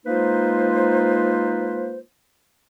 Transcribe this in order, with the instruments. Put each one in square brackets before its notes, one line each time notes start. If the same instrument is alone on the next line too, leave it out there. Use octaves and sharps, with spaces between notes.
[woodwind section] G#3 A#3 D#4 F4 B4 C5